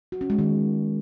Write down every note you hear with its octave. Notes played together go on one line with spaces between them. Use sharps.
F#4
C#4
G#3
D#3